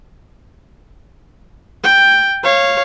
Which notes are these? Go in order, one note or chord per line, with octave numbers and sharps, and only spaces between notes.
G5
C#5 F5